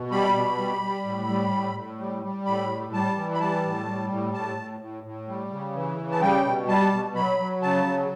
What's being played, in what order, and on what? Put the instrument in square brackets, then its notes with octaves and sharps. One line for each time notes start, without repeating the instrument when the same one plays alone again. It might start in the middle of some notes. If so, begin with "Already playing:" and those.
Already playing: [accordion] B2
G3 B5
B2
G3
G3
A2
G3
A2
A2
G3
G3
A2 B5
G3
G3 A5
E3
B5
G3 A5
A2
G3
A2
A2 A5
A2
A2
A2
G3
C#3
E3
C#3
A5
G3 G5
B2
G3 A5
B2
F#3 B5
F#3
C#3 A5
F#3